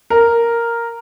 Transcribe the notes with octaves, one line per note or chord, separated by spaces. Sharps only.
A#4